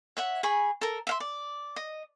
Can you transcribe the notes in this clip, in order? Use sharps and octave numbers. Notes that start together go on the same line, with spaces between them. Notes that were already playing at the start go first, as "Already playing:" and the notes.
C#5 E5 F#5
G#4 G#5 B5 C#6
A4 A#4
E5 F5 C6
D5
D#5